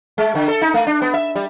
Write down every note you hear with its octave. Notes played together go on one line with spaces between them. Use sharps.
G#3
D3
A4
D#4
A3
D4
B3
E5
G3